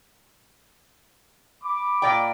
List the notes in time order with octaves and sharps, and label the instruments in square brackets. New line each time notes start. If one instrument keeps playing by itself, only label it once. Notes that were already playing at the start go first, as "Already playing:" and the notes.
[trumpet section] B5 D6
[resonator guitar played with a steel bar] A#2 D5 G5